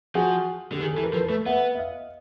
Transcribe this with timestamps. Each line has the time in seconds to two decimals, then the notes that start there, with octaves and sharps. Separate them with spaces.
0.15 F3 F#4 G#4
0.72 D3 G4
0.81 D#3 G#4
0.93 E3 A4
1.04 A#4
1.13 F3 A4 B4
1.24 A4 B4
1.30 A3
1.46 B3 E5 F#5
1.75 E5
1.78 D#5 F5